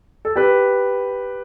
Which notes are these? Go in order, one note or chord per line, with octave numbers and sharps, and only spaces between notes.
A4
G4 B4